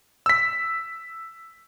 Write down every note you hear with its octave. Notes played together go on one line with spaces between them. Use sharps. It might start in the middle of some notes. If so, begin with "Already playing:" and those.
E6 B6